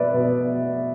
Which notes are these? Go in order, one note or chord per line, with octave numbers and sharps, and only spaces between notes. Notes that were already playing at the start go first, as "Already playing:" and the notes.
Already playing: B2 B4 D5 E5
B2 B3